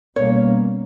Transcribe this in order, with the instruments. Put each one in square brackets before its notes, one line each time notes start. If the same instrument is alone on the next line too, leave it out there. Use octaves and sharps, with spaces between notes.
[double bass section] B2 G3 A#3 C#4 [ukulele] C#5